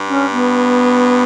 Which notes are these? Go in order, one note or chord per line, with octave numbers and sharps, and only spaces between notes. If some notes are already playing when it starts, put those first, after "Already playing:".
Already playing: G2
C#4
B3